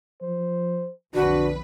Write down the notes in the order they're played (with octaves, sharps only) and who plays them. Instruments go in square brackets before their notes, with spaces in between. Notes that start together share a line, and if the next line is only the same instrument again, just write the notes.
[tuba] F3 [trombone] C5
[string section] B1 F2 B4 [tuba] D3 [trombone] D4 [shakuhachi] F#4